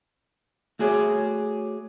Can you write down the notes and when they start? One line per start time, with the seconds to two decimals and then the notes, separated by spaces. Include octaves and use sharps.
0.79 A3 F#4 G#4 C#5 D5